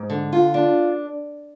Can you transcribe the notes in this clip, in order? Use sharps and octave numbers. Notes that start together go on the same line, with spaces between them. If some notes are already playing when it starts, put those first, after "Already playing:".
Already playing: G#2
D3
F4
D4